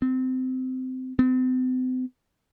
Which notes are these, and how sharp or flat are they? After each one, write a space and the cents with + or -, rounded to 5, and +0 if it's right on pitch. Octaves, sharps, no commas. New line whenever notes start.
C4 -25
C4 -40